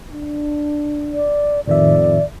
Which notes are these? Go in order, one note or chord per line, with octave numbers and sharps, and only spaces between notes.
D4
D5
F2 A2 D#3 D5 E5